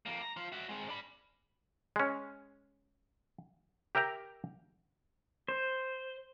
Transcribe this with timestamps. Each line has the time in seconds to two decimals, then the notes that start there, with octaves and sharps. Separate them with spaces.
0.06 F2 A#3
0.22 A#5
0.37 F4 C5
0.52 F#4 E5
0.69 G#3 C4
0.89 D4 B5
1.96 G#3 C#4
3.95 G4 A#4 E5 G5 A#5
5.48 C5